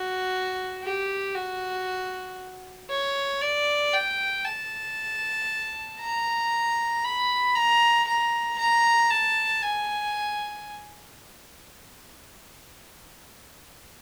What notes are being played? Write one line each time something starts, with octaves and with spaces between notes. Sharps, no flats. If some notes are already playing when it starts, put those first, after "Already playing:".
Already playing: F#4
G4
F#4
C#5
D5
G5
A5
A#5
B5
A#5
A#5
A#5
A5
G#5